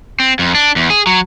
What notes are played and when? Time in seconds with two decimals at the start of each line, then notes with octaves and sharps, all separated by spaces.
0.20 C4
0.39 F2
0.55 D4
0.76 E2
0.90 G#4
1.07 F#3